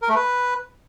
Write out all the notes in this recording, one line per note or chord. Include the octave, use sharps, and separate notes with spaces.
A#4
A3
B4